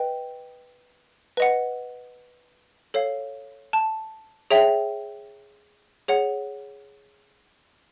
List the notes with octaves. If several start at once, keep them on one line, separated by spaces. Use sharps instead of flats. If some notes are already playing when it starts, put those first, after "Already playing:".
Already playing: B4 D#5 G5
B4 D#5 F#5
A4 C#5 F5
A5
G#4 C#5 E5 G5
G#4 C#5 F#5